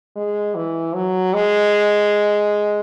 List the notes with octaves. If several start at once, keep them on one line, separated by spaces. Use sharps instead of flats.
G#3
E3
F#3
G#3